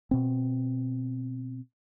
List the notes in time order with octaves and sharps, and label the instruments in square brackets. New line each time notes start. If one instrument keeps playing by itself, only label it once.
[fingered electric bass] B2 C4